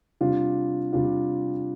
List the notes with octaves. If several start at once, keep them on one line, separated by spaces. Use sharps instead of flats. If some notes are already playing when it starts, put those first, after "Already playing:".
C3 G3 D4 F4
C3 G3 D4 F4